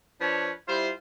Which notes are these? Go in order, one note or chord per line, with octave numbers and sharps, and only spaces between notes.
F3 D4 B4 C#5
G3 E4 F4 C5